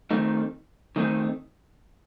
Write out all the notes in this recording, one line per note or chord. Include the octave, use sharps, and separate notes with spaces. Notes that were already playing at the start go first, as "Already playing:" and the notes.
D#3 A3 C4 D#4
D#3 A3 C4 D#4